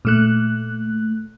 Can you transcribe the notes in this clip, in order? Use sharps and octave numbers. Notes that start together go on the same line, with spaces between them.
A#2 A3 F#6